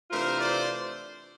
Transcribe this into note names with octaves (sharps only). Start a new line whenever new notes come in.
C3 E3 A3 D4 F4 A#4 C5
C5 D5